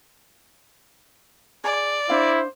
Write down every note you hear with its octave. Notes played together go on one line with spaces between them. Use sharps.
G#4 D5
D4 E4 C5 F5